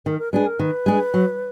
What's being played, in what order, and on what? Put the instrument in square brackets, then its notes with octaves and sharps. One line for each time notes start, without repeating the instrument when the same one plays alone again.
[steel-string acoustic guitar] D#3 [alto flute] A#4
[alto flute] A#4
[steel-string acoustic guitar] G#3 D4 G#4 [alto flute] B4
[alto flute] A#4
[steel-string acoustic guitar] D#3 [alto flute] B4
[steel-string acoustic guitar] G#3 D4 G#4
F#3